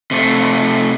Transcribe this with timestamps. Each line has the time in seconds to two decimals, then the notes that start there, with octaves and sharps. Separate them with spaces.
0.11 C3 A3